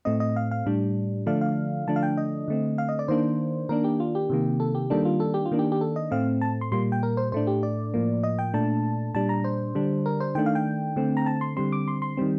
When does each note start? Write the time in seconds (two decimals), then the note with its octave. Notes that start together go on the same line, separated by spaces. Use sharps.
0.05 A2 A3 C4 D#5
0.20 D#5
0.36 F5
0.51 F5
0.66 A2 G3 D4
1.26 D3 F3 A3 D4 F5
1.41 F5
1.87 D3 F3 A3 D4 A5
1.96 F5
2.03 G5
2.17 D#5
2.48 D3 A3 C4
2.78 F5
2.89 D#5
2.99 D5
3.08 D#3 A#3 D4 C5
3.69 D#3 A#3 D4 A#4
3.84 G4
4.00 F4
4.15 G4
4.30 C3 D#3 A#3
4.60 A4
4.75 G4
4.90 D#3 G3 A#3 D4 A4
5.05 F4
5.20 A4
5.34 G4
5.45 F4
5.51 D#3 A#3 D4
5.59 G4
5.72 G4
5.81 A4
5.96 D#5
6.11 A2 A3 C4 F5
6.41 A5
6.61 C6
6.72 A#2 G3 A#3 C6
6.92 G5
7.03 A#4
7.17 C5
7.32 A2 A3 D4 C5
7.47 G4
7.63 D5
7.94 A2 F3 A#3
8.23 D#5
8.39 G5
8.54 A#2 A3 D4 A5
9.14 A#2 G3 D4 A5
9.29 A#5
9.44 C5
9.75 D3 G3 D4
10.06 A#4
10.20 C5
10.35 D#3 A3 D4 G5
10.46 F5
10.55 G5
10.96 D3 A3 C4
11.17 A#5
11.26 A5
11.41 C6
11.56 D3 G3 C4 C6
11.72 D6
11.88 C6
12.02 C6
12.17 D#3 G3 C4